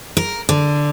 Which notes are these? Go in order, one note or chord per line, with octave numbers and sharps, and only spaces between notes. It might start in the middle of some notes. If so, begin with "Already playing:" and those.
A#4
D3